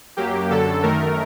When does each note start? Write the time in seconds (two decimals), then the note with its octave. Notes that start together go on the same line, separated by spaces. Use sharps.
0.17 F#2 F#3 A#3 G4
0.50 F#2 D3 F#3 A4
0.83 F#2 D#3 A3 A#4